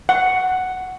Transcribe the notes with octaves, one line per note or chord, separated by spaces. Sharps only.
F#5